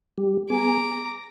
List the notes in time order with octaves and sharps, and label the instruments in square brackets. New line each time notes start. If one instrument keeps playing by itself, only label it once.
[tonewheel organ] G3 G4
[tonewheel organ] B3 G#4 G#5 [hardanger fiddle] A#5 D6
[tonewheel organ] A#6